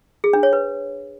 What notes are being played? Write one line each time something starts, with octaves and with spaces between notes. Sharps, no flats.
G#4
D4
C#5
B4